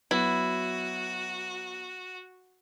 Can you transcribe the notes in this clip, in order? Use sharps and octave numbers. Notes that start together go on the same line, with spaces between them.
F#3 B3 E4 F#4